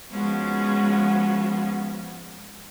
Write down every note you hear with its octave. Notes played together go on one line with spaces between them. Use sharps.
F3 G#3 B3 C#4 F4 F#4